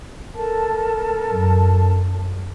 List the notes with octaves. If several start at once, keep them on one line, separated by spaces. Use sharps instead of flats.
A4 A#4 A5
F#2